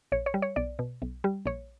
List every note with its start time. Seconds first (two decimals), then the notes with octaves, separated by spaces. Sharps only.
0.12 A#1 C#5
0.26 C#5
0.34 G3
0.42 C#5
0.56 B1 D5
0.79 B2
1.02 B1
1.24 G3
1.46 A#1 C#5